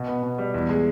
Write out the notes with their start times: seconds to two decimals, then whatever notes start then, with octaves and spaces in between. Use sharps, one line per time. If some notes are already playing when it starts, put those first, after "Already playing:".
Already playing: B2
0.08 B3
0.23 B2
0.38 G3
0.54 E2
0.69 G#3